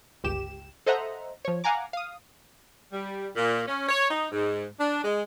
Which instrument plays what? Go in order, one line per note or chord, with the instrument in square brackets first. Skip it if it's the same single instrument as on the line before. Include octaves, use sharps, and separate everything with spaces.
[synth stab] G1 C#2 G4 E7
A4 C5 D#5 E5 F#5 A#5
F3 C#5
F5 F#5 G#5 A#5 D6
F5 D#6
[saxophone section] G3
A#2
C#4
C#5
D#4
G#2
D4
G#3